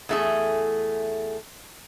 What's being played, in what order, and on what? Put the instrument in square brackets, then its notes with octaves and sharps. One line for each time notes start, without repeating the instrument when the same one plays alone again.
[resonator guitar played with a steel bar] E2 A3 G#4